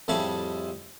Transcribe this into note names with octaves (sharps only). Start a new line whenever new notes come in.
F2 A2 G3 G#4 A4 E5